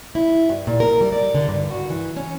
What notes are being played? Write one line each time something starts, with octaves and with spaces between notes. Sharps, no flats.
E4
G2
A#2
A#4
G3
D5
D3
G2
F#4
E3
C#4